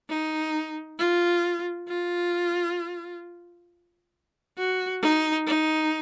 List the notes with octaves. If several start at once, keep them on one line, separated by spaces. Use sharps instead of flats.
D#4
F4
F4
F#4
D#4
D#4